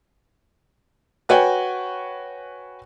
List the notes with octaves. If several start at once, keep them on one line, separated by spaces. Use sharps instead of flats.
F#4 B4 C#5 G5 G#5